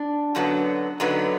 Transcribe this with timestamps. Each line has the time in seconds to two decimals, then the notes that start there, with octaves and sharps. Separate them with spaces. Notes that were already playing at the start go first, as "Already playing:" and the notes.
Already playing: D4
0.35 F#2 D3 F#3 B3
1.00 F#2 D3 F#3 B3 D#4